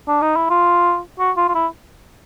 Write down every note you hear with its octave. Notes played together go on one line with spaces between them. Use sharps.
D4
D#4
E4
F4
F#4
F4
F4
E4